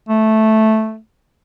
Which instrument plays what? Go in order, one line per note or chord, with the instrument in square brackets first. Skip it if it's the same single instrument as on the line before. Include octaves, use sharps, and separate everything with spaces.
[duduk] A3